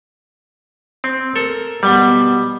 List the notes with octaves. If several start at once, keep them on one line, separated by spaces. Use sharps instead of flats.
C4
A4 A#4
B2 G3 B3 B4